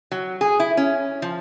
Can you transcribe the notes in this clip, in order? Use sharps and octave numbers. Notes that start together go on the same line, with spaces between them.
F#3
G#4
E4
C#4
F3